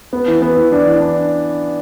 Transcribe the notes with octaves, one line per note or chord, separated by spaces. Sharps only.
B3
E3
B3
E3
D4
E3
D4